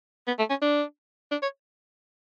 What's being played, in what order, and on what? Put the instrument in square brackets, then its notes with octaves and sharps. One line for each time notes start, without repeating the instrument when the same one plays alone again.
[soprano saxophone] B3
A3
C#4
D4
D4
C#5